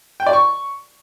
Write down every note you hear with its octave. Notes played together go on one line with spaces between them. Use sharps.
G5
D5
C#6